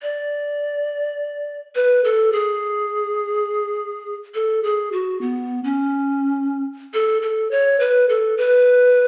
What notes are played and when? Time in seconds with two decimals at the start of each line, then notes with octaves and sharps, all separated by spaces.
0.02 D5
1.75 B4
2.04 A4
2.33 G#4
4.34 A4
4.63 G#4
4.92 F#4
5.21 B3
5.64 C#4
6.94 A4
7.22 A4
7.51 C#5
7.80 B4
8.09 A4
8.38 B4